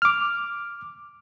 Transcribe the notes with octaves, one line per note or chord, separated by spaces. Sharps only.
D6 F6